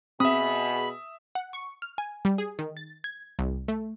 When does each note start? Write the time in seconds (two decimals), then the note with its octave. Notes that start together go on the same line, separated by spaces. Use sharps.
0.20 B2 C4 G#4 E5 B5 D#6
1.35 F#5
1.53 C#6
1.82 F6
1.98 G#5
2.25 G3
2.38 G#4
2.59 D#3
2.77 A6
3.04 G#6
3.39 C2
3.68 A3